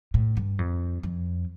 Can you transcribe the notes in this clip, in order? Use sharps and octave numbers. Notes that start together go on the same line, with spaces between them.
A2
G2
F2
F2